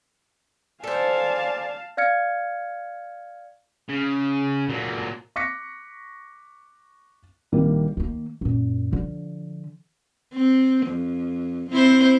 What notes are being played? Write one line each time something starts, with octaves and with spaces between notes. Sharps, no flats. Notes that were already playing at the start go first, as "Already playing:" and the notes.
A4 C5 D5 F5 G#5 A5
D5 F5 F6 G#6 C#7
C#3
A#2 F#3
C#6 D6 F#6 A#6 B6 C#7
A#1 D#3 G3 A#3
D#3 A#3
F#2 A#2
D3 F3
C4
F2
C4 E4 C5